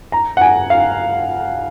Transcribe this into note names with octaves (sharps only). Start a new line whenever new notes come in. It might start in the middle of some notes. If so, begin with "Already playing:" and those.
A#5
F#5
G#5
F5